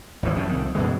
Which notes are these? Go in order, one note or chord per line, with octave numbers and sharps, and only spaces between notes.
G#1 D2 E3 F3
F#2 A2 C3
C2 F2 D#3
F#2 B2 E3 G#3